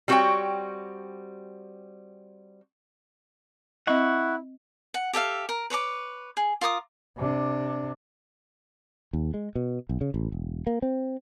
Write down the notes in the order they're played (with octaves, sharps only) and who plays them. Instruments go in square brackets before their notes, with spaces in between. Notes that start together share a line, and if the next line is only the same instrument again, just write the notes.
[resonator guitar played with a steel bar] G3 C4 F#4 C5 C#5 G5
[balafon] C4 D#5 [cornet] E4 [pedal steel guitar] F#5 C#6
[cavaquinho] F#5
G4 A4 E5 F5
A#4
B4 C#5 A#5 D6
G#4
F4 A#4 D6 D#6
[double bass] C3 D4
[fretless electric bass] D#2
G#3
B2
B1
C#3
A1
E1
A#3
C4